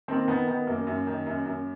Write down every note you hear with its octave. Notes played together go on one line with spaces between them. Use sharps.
D#3 A#3 C4
D#3 B3
D#3 B3
F#2 A#3
F#2
D#3
F#2
F#2